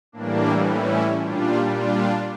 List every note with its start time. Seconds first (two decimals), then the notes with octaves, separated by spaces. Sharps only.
0.12 A2 E3 G3 A#3 D4
0.66 C#4 E4
1.20 A#2 G3 D4 F4
1.74 D4 F4